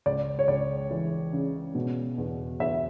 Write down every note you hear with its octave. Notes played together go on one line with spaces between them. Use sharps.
C#2 D5
C#5
C#2 D5
E3
C#3
B2
E2
E2 E5